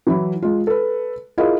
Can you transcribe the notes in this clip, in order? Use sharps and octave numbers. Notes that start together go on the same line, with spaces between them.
E3 F#3 E4
G#3 F4
A4 B4
E4 F4 G#4 A#4 D#5 F5